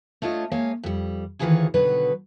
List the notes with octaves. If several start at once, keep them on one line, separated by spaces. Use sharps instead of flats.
A3 D4 F4 C#5 D#5
G#3 A#3 C#5 F5 G#5
F2 G3
D2 D#3 E3 F4 G#4 C#5
B2 D3 D#3 F#3 B4